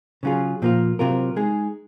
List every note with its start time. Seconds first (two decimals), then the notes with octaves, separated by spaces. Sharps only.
0.23 C#3 F#3 C#4 F4 G#4
0.62 A#2 F3 A#3 F4
0.99 C3 F#3 C4 F4 A#4
1.36 G#3 D#4 G#4